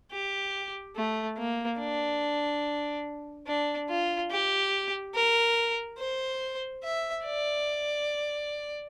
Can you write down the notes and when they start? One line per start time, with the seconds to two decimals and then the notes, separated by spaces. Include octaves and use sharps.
0.12 G4
0.96 A3
1.38 A#3
1.79 D4
3.47 D4
3.89 F4
4.31 G4
5.15 A#4
5.99 C5
6.83 E5
7.25 D5